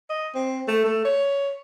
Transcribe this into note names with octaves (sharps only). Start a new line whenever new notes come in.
D#5
C4
A3
A3
C#5